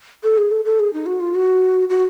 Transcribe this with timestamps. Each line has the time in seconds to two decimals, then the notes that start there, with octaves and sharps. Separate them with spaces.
0.24 A4
0.38 G#4
0.51 A4
0.65 A4
0.79 G#4
0.93 D#4
1.06 F#4
1.20 F4
1.35 F#4
1.90 F#4